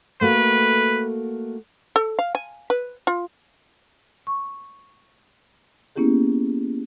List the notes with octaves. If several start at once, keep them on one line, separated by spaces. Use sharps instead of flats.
A3 A#3 F#4 B4
A4
F5
G#5
B4
F4
C#6
A#3 B3 C#4 E4 G4 G#4